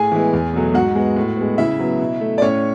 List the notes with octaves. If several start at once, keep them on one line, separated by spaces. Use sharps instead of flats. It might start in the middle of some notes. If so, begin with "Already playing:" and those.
Already playing: A2 G#4 G#5
E3 G#3 B3
E2
B2 F#3 A3
G#2 F#4 F#5
G#3 B3
A2
G#3 B3
C#3 E4 E5
F#3 B3
B2
A3
D5
A2 C#4 C#5